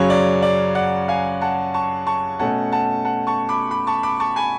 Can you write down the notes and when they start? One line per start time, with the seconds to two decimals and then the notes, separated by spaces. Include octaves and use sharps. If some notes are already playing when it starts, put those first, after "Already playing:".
Already playing: F#2 C#3 F#3 C#5 F5
0.10 D5
0.42 D5
0.75 D5 F#5
1.08 F5 G#5
1.41 F#5 A5
1.74 A5 C#6
2.07 A5 C#6
2.39 B2 A3 C#4 F#5 A5
2.72 F#5 A5
3.05 F#5 A5
3.27 A5 C#6
3.49 B5 D6
3.71 B5 D6
3.87 A5 C#6
4.03 B5 D6
4.20 A5 C#6
4.36 G#5 B5